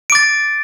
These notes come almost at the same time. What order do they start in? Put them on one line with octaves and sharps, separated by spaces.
D7 D6 A6